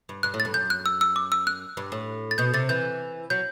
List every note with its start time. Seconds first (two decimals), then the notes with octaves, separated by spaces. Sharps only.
0.09 G2
0.23 G2 F#6
0.34 A2
0.40 A6
0.45 G2
0.54 F#2 G6
0.70 F#6
0.86 E6
1.01 E6
1.16 D6
1.32 E6
1.47 F#6
1.77 G2
1.92 A2
2.31 A6
2.38 B2 G6
2.54 C3 A6
2.69 E3 G6
3.30 F#3 G6